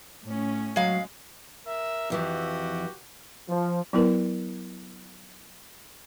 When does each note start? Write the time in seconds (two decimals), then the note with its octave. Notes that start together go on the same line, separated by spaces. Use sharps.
0.23 A2 C#4
0.76 F#3 G#3 F5
1.65 A#4 E5
2.10 F2 E3 F3 F#4 G4
3.49 F3
3.93 F#3 B3 E4 A#4 B4